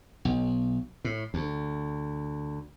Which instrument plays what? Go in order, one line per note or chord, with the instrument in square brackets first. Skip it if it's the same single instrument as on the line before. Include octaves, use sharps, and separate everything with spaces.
[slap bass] B1
A2
D2